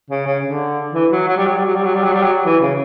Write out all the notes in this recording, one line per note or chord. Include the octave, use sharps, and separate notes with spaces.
C#3
C#3
D3
E3
F#3
F#3
G3
F#3
G3
F#3
G3
F#3
G3
F#3
G3
F#3
E3
C#3